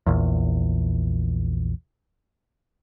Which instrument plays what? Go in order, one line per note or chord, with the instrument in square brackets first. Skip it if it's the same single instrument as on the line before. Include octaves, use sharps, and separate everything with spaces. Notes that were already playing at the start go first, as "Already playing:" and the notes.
[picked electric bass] A#1 E2